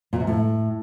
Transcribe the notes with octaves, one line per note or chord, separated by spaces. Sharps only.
A#2
C3
A2